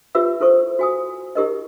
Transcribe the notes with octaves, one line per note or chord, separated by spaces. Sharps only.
F4 G4 B4 E5 E6
E4 A4 C5 C#6
F#4 G#5 D#6
E4 G4 A#4 D#5